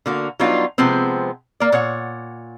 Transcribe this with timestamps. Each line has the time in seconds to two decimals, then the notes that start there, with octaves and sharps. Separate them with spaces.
0.06 D3 A#3 F#4
0.40 F#3 G3 B3 D4 D#4 F4
0.78 C3 F3 G#3 B3 C4
1.60 A#3 D5
1.72 A#2 C#5 F#5